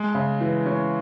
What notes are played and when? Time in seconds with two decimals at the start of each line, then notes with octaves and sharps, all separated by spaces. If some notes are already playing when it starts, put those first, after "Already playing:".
Already playing: G#3
0.15 C#3
0.41 E3
0.66 C#4